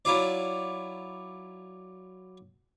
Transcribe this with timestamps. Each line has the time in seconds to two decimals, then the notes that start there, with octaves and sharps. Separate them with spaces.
0.05 F#3 E4 F4 D5